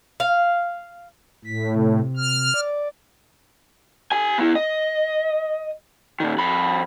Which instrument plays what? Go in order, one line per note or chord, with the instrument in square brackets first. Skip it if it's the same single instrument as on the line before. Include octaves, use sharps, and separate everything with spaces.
[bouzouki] F5
[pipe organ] A2 [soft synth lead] B6
[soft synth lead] C3
[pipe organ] F6
[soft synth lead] D5
[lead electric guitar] G4 G#5
B3 E4
D#5
A#2 D#3
F2 B5